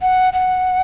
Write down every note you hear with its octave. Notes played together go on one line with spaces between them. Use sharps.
F#5
F#5